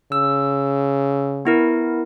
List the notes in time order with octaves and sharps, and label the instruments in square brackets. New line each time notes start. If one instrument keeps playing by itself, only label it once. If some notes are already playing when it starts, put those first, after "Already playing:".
[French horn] C#3 [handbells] E6
[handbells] B3 E4 A#4